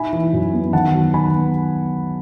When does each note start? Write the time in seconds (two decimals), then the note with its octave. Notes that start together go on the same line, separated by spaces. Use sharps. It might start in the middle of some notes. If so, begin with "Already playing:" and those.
Already playing: D#4 E4 G#5 B5
0.13 E3
0.33 F#2
0.53 B3
0.73 D#3 F#5 A5
0.94 F#3
1.14 D#3 G#5 B5
1.34 B3